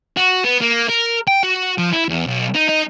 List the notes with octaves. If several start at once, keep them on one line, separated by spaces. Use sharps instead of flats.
F#4
B3
A#3
A#4
G5
F#4
F3
E4
E2
B1
D#4
D#4